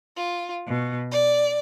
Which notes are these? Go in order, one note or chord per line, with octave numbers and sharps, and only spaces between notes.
F4
B2
D5